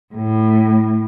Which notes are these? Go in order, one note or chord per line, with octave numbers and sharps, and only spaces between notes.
A2